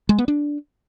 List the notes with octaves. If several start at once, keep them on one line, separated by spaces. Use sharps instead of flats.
G#3
B3
D4